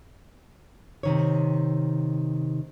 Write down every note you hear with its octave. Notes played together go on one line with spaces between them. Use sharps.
C3 D#3 C#5